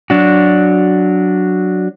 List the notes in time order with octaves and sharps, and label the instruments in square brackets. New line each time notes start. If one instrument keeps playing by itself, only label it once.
[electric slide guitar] F#3 D4 F#4